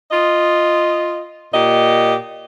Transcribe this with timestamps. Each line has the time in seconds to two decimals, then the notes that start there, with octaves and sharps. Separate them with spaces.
0.11 F4 D#5
1.52 A#2 G4 D#5